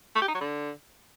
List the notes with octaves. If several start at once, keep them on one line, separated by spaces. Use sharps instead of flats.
A3
G4
D#4
F#3
D3